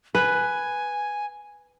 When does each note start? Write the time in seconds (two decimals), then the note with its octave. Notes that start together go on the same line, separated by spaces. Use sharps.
0.15 B4 G#5